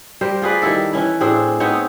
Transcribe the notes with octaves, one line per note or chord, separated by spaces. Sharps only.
G3 A#4 C5
F4 G#4 B4 D5
D#3 G3 E4 A4
E3 C#4 E4
A2 C4 D4 G#4
B3 C4 D#4 C#5